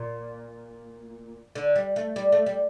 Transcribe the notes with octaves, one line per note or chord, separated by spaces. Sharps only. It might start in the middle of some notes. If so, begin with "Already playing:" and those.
Already playing: A#2
D3
G3
A3
G3
A3
G3